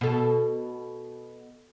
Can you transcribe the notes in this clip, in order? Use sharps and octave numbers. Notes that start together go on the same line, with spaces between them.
B2 A4